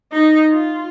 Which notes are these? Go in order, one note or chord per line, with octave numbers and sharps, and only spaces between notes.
D#4
F4